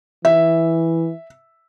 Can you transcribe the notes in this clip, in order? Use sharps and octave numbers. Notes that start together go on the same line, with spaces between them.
E3 E5